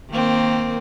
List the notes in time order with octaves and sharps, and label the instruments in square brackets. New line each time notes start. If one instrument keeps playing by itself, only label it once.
[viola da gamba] D#3 A#3 C4